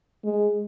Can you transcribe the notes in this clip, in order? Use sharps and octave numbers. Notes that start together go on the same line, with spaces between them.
G#3